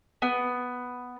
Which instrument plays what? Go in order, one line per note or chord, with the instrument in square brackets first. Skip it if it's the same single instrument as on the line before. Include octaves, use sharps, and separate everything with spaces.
[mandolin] B3